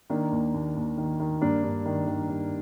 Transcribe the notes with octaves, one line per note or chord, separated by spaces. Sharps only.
D#3 A#3 D4
D#2
D#2
D#2
D#3
D#3
G2 A#3 D4
G2
D#3
D#3
G2